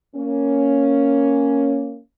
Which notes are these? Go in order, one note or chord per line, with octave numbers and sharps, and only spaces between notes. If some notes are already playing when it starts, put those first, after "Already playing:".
A#3 C#4